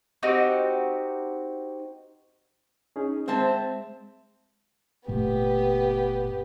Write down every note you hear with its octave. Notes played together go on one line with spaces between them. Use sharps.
C4 D#4 F#4 G4
C#4 D#4 G#4
G#3 C4 C5 E5 A5
F#1 A#2 A3 B3 G4